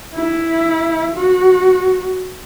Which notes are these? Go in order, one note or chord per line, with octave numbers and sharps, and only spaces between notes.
E4
F#4